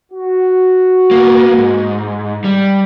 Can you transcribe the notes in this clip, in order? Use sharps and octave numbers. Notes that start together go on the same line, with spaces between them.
F#4
A#3 B3
G#2
G3